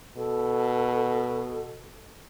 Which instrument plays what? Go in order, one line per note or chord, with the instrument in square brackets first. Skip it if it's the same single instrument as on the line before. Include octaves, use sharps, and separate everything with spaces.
[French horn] B2 [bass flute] A4